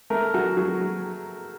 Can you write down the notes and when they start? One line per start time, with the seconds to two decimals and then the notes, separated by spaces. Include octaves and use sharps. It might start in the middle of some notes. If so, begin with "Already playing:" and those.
0.10 A3 A#4
0.34 F#3 F#4
0.57 F#3 F#4
0.81 F#3